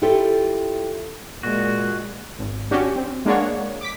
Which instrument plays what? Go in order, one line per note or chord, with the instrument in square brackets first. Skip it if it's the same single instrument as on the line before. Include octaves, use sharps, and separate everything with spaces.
[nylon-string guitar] E4 F4 G4 A4 C#5
[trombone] A#2 [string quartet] G#3 [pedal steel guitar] F#4
[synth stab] G#1
C#4 D4 F#4 G4
C4
G#3 A#3 D4 G#4 C#5 F#5
D6 B6